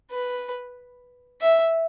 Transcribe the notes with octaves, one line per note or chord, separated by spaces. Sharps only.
B4
E5